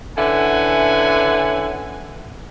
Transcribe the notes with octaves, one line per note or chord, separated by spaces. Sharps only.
D3 C#4 E4 B4 F#5 G#5